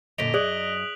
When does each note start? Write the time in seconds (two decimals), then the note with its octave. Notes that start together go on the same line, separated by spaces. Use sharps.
0.18 F#2 A#2 D3 D#5 B6 D7 F7
0.34 F#2 G#4 D5 D#6 F#6 F#7